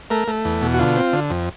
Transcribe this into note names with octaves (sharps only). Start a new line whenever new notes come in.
A3 A#4
A3
E2
B2
F#4
D3 F4
C4
D3
F2